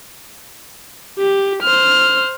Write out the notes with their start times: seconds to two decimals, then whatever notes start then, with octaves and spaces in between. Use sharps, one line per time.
1.19 G4
1.62 C5 F6